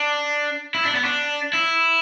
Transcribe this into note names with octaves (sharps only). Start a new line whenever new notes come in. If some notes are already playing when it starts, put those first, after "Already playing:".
Already playing: D4
E4
D4
B3
D4
E4